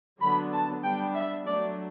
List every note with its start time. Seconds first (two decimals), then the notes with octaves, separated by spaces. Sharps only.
0.20 D3 F#3 B3 D4 B5
0.52 A5
0.83 G3 B3 D4 G5
1.14 E5
1.46 F#3 A3 D4 D5